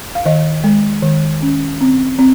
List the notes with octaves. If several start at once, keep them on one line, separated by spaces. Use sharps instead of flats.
F5
D#3 D#5
G#3
D#3
C#4
C4
C4